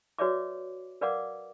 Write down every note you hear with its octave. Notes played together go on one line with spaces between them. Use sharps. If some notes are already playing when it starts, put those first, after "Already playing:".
F#4 B4 C#5 D5 E5 D6
A#4 B4 D5 F5 F#5 D6